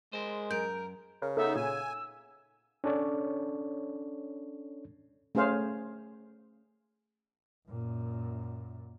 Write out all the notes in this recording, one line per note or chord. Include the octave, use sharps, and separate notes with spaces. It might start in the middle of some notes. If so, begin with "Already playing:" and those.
G#3 A#4 C5
F#2 A#4 G6 D7
C#3 A#4
B3 D#4 A4 E5
A#2 G#5 E6
C#4 D4 A4 C#5 D5
A3 C#4 G#4 C5 F5
F#2 A#2